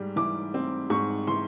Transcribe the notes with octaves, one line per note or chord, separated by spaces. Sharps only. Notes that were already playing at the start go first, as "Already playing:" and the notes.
Already playing: G#2 G3
E3 D6
C4
G#2 C#6
E3 C6